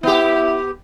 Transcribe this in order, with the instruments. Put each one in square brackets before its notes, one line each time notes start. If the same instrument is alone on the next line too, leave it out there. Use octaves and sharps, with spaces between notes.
[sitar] B3 G4 [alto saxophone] E4